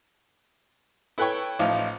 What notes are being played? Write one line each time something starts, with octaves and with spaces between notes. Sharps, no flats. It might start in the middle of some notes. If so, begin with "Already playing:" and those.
E4 A4 B4 C#5 G5 C#6
A1 F3 D#4 F4 F5